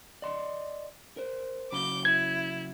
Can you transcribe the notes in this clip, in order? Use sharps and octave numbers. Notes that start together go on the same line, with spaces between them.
D5 D#5 C6
A#4 C5
C#3 F#3 B5 D6 G6
E4 G#6